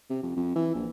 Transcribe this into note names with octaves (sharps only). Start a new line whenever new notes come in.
C3
F2
F2
E3
A#1